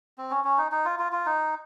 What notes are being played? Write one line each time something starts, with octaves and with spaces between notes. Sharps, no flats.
C4
C#4
C#4
D#4
D#4
F4
F4
F4
D#4